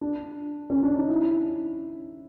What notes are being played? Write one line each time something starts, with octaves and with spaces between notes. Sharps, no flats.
D4
C#4
D4
D#4
E4